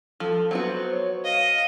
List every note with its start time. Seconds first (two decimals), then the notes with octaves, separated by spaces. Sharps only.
0.20 F3 A4
0.51 F#3 B3 F#4 C5
0.93 C#5
1.24 D#5 F5